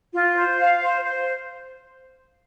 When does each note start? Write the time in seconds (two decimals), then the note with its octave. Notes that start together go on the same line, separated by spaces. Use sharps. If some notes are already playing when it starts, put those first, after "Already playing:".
0.14 F4
0.36 C5
0.59 F5
0.81 C5
1.03 C5